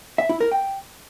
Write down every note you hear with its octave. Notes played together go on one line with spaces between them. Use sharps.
E5
E4
A#4
G5